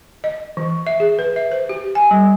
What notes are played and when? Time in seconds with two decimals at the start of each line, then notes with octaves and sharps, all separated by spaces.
0.24 D#5
0.57 E3
0.87 E5
1.00 G#4
1.19 B4
1.36 E5
1.51 C5
1.69 G4
1.95 G#5
2.11 G3